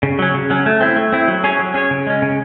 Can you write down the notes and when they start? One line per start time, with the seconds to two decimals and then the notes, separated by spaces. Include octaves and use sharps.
0.03 C#3
0.19 F#3 C#4
0.34 C#3
0.50 F#3 C#4
0.66 A3
0.81 C4 E4
0.96 A3
1.12 C4 E4
1.28 F#3
1.44 C#4 G#4 C#5
1.59 F#3
1.74 C#4 G#4 C#5
1.91 C#3
2.07 G#3 C#4
2.22 C#3